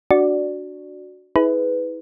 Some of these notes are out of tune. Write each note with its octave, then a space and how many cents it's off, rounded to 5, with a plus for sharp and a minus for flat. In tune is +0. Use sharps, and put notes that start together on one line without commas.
D4 +0 F#4 +0 D5 +0
E4 -35 G#4 +20 B4 +15